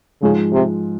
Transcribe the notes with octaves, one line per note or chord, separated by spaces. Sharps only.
G#2 C#3 F3 G#3
C3